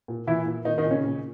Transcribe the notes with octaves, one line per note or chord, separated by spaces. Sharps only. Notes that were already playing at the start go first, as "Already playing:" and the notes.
A#2
A#2 E3 E4
A#2
A#2 D#3 D#4
D#3 D#4
A#2
C#3 C#4
A#2